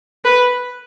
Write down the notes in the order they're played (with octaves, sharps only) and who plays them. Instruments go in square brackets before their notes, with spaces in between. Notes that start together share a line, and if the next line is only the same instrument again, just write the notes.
[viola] B4